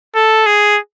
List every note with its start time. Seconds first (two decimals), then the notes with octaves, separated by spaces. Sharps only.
0.16 A4
0.46 G#4